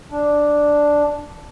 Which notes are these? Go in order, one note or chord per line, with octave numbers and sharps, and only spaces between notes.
D4